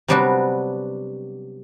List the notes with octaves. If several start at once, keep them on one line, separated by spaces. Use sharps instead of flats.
C3 F#3 G3 B3 D4 F#4